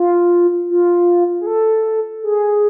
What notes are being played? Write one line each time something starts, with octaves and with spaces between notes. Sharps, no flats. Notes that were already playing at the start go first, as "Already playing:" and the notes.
Already playing: F4
F4
G#4
A4
G#4